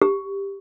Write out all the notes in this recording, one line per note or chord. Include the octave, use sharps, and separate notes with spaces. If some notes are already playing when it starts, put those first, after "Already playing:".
G4